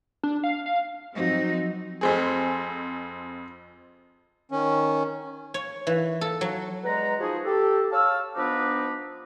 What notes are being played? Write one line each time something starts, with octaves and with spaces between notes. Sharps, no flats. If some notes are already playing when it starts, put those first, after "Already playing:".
D4
F5
F5
G2 F3 F#3 C4 D#4 F#4
F2 C4 G#4
D#3 C#4
C#5
E3
A4
F#3
E2 G#3 B4 F#5 A#5
F3 D#4 F#4 G#4
G4 A4
C#5 F5 A5 E6
F3 B3 D4 D#4 B4 D6